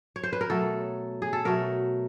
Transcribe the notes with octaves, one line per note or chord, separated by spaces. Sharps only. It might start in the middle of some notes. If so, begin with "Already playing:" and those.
C#5
C5
B4
A#4
B2 F#3 A3 A4
G#4
A4
B2 F#3 A3 A#4